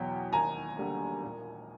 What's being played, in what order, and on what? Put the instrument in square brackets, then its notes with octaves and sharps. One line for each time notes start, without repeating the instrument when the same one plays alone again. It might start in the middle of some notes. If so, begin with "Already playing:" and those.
Already playing: [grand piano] E2 B2 F#3 [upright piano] G5
[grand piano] D#2 [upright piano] G#5 A#5
[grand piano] D3 G3 A#3
A#2